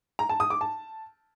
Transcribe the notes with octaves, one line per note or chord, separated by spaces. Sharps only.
A#5
A5
D#6
D6
A5